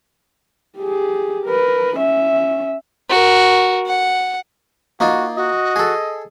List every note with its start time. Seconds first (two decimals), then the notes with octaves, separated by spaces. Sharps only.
0.78 G4 G#4
1.47 A#4 B4
1.97 C#4 E5
3.10 F#4 A#4
3.87 F#5
5.00 A#3 D#4 F4 F#4
5.37 F#4 D#5
5.76 G#4 A4